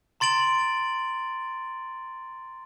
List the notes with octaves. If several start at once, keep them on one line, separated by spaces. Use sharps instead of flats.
A#5 C6 A6 D7 F#7